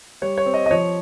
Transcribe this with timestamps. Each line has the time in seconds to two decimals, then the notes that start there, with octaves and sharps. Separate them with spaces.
0.22 G3 C#5
0.38 C#5
0.46 C4
0.54 D#5
0.66 D#5
0.71 F3 C#5